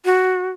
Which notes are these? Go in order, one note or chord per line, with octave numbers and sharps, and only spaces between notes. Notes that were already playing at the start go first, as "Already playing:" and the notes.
F#4